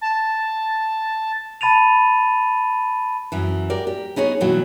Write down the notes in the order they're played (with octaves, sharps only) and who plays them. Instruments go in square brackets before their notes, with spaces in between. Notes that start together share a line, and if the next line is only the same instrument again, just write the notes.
[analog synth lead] A5
[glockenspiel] A5 B5 A6 D#7 F7
[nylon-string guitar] F#2 E3
G4 A#4 D5
G4
B3 D#4 G#4 C#5
B2 E3 F#3 G3